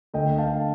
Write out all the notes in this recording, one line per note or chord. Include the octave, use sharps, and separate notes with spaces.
D2 D3 A3 D#5 G5
F5 A5